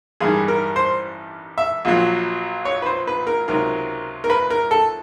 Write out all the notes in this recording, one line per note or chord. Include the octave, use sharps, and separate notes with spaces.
A1 G2 D#3 G3 G#4
A#4
C5
E5
A#1 A#2 F#3
C#5
B4
C5
B4
A#4
C#2 C3 D#3 F#3 A#4
A#4
B4
A#4
A4